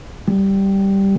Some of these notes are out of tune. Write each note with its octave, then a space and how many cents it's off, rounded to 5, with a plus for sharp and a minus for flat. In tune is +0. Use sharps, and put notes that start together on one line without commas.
G3 -5